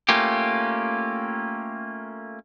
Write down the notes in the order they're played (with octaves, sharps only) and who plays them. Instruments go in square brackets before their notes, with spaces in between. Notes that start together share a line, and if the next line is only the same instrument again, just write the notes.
[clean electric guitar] A3 A#3 C#4 F4 G4